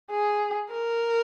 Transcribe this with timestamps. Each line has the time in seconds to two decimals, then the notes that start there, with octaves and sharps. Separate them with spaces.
0.10 G#4
0.71 A#4